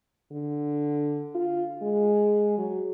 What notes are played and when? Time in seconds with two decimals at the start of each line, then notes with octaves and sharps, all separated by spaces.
0.32 D3
1.35 F4
1.82 G#3
2.58 F#3